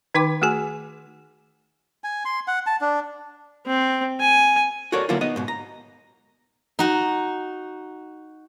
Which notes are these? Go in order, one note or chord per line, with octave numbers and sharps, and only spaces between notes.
D#3 D#4 B4 G5 C6 D6
A3 F#4 G#4 G#5
G#5
C6
F#5
A5
D4
C4
G#5
F#4 A4 A#4 C#5 D5 F#5
D3 F#3 A#3 B3 E4 F4
B3 D#4 D#5
G#2 B2
A#5
D#4 F#4